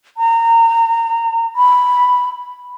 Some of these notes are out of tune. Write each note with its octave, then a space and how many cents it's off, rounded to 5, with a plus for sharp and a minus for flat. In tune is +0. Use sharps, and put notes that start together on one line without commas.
A#5 -25
B5 +0